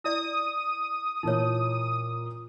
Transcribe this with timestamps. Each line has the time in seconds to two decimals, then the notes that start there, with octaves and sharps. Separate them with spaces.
0.04 E4 D5 D#6
1.23 A#2 E3 D#4 C#5